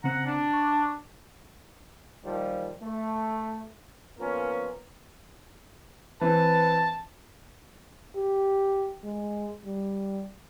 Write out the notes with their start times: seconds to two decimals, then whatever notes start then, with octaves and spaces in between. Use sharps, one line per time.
0.04 C#3 C4 F#5 A#5
0.26 D4
0.54 C#6
2.25 A#2 D#3 F3 G3
2.82 A3
4.18 F3 A#3 B3 C#4 F4 A#4
6.21 E3 C4 B4 A5
8.16 G4
9.04 G#3
9.65 G3